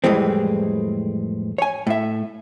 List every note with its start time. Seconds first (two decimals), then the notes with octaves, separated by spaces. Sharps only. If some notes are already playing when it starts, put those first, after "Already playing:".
0.04 F2 A2 E3 G3 G#3 C4
1.58 C#5 G#5
1.87 A2 E5